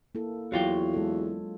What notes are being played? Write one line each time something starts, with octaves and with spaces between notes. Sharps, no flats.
A#3 E4 A4
E2 F#3 F4 F#4 C#5 F5 G5
G#3 D4 A4